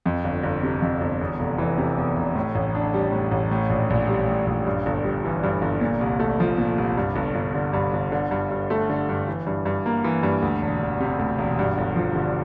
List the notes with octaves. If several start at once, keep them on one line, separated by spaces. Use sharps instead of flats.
F2
G1
G1
C3
F2
G1
E2
F1
E3
C3
E2
F1
A2
A1
D4
G3
A2
A1
A2
A#1
A#1
G3
A2
A#1
G2
G1
G3
E3
G2
G1
A#2
C2
A3
F3
A#2
C2
G2
G1
G1
D3
G2
G1
D3
G2
G2
A3
D3
G2
E3
G2
G2
A#3
E3
G2
D2
E1
E1
C3
D2
E1
G2
G1
F3
D3